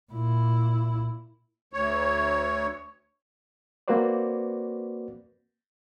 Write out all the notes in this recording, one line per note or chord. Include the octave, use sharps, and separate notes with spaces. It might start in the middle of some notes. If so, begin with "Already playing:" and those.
A#2 E4
D2 C#5
A#3 C4 F#4 B4 C5 D5